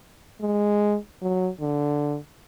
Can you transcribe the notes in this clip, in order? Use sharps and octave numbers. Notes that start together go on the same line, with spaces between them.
G#3
F#3
D3